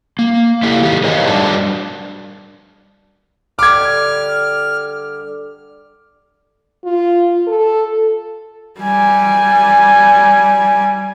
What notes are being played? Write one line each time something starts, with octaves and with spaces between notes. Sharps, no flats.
A#3
A#3 E4 G4 A4 F5
D#3 G4 G#4
G#4 A#4 C5 C#5 D#5 F5
G3 D4 F#4 A#4 D5 A5
D3 G3 D6 F6 G#6
F4
A4
G3 G#5